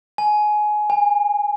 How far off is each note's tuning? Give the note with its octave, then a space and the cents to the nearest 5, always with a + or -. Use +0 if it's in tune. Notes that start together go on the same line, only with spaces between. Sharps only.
G#5 +20
G#5 -25